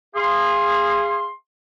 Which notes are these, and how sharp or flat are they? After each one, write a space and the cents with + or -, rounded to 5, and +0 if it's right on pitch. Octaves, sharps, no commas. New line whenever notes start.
G#4 -20 F5 -25 C6 +10